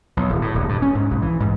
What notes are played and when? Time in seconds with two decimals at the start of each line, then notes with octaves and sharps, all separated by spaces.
0.17 B1
0.30 D1
0.42 A2
0.55 D#1
0.69 G2
0.82 C#4
0.95 G#2
1.11 B1
1.22 E3
1.40 G#2